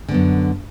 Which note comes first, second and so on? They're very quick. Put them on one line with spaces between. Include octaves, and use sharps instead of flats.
D3 B3 F#2